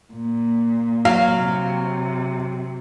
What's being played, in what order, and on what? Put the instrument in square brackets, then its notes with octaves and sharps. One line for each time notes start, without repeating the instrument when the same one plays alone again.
[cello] A#2
[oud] F#3 [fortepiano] F5
[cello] C3